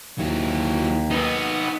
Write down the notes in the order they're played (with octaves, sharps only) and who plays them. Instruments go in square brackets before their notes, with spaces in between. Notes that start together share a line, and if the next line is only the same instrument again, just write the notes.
[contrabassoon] D#2 [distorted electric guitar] F#3 E4
[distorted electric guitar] B3 [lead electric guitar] D#4 B4